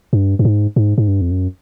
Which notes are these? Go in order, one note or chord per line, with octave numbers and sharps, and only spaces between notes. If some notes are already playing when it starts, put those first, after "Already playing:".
G2
G2
G#2
G#2
G#2
G2
F2
F#2